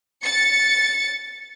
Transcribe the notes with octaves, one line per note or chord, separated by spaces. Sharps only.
A6 C#7